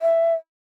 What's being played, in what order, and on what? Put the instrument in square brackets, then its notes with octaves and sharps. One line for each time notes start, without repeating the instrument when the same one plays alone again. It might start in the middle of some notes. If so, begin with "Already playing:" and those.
[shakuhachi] E5